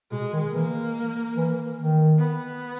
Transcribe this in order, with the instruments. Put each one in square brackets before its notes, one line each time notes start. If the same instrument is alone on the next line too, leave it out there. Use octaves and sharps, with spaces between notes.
[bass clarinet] B2 [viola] G#3
[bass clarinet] D#3
[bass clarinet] E3 [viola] A#3
[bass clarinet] E3
D#3
[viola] B3